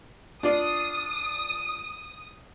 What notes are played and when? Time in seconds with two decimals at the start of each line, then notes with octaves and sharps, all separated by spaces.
0.43 D4 F4 D5 D#6